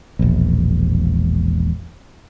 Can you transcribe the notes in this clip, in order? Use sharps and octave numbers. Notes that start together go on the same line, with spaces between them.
E1 A#1